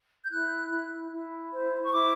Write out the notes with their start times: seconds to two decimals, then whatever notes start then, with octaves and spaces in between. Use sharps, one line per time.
0.25 G6
0.30 E4 F#6
0.71 E4
1.11 E4
1.52 C5
1.82 C#6
1.92 E4 D6